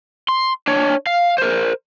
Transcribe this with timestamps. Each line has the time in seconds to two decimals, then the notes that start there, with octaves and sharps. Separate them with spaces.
0.28 C6
0.67 D4 C#5
1.06 F5
1.38 A#4 C5